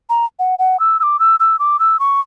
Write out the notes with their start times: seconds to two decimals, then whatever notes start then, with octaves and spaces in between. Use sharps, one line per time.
0.10 A#5
0.39 F#5
0.59 F#5
0.80 E6
1.00 E6
1.03 D6
1.19 E6
1.40 E6
1.59 D6
1.79 E6
1.99 C#6